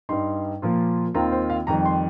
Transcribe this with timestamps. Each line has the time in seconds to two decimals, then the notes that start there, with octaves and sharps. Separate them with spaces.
0.09 G2 G3 D#4 C6
0.62 A#2 F3 A#3 F4
1.14 D#2 D#3 C4 F4 A#5
1.32 C5
1.50 F5
1.67 F2 D#3 G3 A#5
1.86 C6